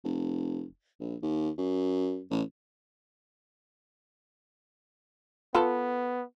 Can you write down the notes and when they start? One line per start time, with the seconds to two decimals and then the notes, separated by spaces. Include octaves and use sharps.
0.04 F1
1.00 A#1
1.22 D#2
1.58 F#2
2.31 A1
5.55 B3 F4 A4 B4